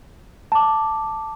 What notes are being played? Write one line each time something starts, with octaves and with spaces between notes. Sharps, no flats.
A5 D6